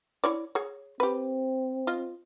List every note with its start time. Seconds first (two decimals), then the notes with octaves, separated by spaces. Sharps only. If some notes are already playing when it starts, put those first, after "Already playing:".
0.24 E4 C#5 D5
0.55 G#4 C#5
1.00 C4 G4 B4
1.87 F4 D#5